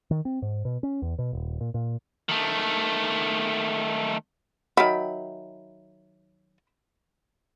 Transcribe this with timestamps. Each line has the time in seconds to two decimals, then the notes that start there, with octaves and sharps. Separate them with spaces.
0.11 D#3
0.25 C4
0.42 G#2
0.65 B2
0.83 C#4
1.02 E2
1.18 B2
1.33 D#1
1.61 A#2
1.74 A#2
2.29 D#3 A3
4.77 D#3 F#3 E5 G5 B5